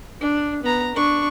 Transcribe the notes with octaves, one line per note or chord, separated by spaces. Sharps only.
D4
B3 A#5
D4 C#6